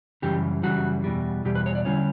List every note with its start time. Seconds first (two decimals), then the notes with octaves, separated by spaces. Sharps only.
0.22 F#2 C#3 E3 G3 G4
0.63 F#2 C#3 E3 G3 F#4
1.04 E2 B2 G3
1.45 E2 B2 G3 G4
1.55 B4
1.66 C#5
1.75 D5
1.85 D3 G3 C#4 E4 C#5